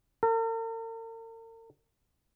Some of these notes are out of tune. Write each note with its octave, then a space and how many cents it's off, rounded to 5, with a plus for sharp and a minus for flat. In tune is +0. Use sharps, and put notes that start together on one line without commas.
A#4 -45